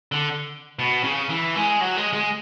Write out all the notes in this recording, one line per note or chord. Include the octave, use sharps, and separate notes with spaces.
D3
B2
C#3
E3
G#3
F#3
G#3
G#3